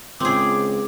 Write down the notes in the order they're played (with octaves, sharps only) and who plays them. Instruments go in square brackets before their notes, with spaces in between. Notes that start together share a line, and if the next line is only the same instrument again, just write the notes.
[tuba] C#2 [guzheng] C4 G#4 [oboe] D6